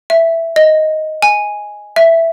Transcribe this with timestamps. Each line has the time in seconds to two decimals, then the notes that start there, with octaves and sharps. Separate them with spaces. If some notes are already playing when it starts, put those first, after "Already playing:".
0.10 E5
0.56 D#5
1.22 G#5
1.96 E5